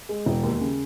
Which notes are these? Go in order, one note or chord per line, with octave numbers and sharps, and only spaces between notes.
G#3
E1
D#2
C#3